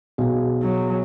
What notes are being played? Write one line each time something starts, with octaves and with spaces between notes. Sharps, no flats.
B1 F#4 G#4
F#3